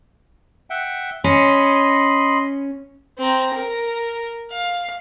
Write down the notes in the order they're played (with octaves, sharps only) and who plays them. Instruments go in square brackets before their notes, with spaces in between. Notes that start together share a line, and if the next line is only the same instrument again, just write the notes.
[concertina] E5 F#5 G5
[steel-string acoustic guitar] C#4 [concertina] D#5 B5 C6
[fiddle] C4 A#5
A#4
F5